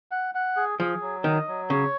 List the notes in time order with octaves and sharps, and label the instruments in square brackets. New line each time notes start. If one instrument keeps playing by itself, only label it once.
[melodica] F#5
F#5
G#4
[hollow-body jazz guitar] F3 [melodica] G#4
[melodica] F#3
[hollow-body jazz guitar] D#3 [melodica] D#5
[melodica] F#3
[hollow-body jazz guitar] C#3 [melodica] C#5